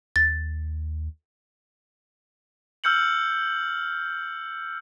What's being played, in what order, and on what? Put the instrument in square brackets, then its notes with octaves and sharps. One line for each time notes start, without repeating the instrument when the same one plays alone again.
[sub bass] D#2 [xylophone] A6
[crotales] E6 F6 G6 C#7 F#7